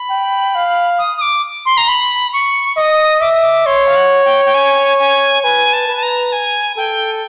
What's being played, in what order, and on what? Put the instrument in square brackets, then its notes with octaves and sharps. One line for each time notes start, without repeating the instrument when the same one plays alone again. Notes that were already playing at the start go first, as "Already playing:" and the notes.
Already playing: [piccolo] B5
[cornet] G5
F5
[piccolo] D#6
D#6
D6
C6
A#5
B5
C#6
[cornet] D#5 [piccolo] D#6
[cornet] E5 [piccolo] D6
[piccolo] D#6
D6
[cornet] C#5 [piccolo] C6
[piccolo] F5
F#5
G5
G5
G#5
G#5
[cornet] B4 [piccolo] G#5
[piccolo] A5
[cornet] B4
[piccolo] A5
A#5
G#5
[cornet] A4 [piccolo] G5